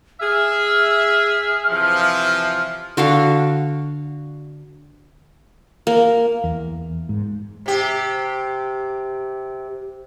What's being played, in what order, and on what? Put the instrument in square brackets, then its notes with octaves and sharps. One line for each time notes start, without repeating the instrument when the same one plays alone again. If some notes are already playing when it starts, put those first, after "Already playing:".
[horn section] G#4 E5 [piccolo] F6
[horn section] C3 E3 F3
[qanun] D3 F#4 A4 F5
A#3
[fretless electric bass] E2
G#2
[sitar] C3 G4